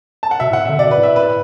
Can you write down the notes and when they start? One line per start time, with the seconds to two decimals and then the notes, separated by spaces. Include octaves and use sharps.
0.23 A5
0.31 F#5
0.40 B2 E5
0.50 A2
0.53 F#5
0.65 E5
0.69 D3
0.79 B2 D5
0.91 B4
0.98 A2
1.03 E5
1.16 B4